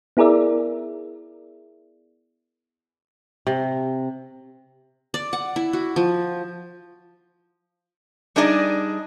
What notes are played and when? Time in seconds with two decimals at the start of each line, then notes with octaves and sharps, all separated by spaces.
0.17 B3 E4 G#4 A#4 D5 E5
3.47 C3
5.14 D5
5.33 F#5
5.56 E4
5.73 F#4
5.96 F3
8.36 G3 D4 D#4 G#4 D5 D#5